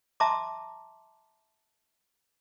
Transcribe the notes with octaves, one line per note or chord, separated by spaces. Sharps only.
E5 A5 A#5 C6 D6